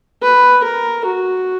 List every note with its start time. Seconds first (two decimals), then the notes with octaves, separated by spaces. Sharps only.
0.22 B4
0.64 A#4
1.05 F#4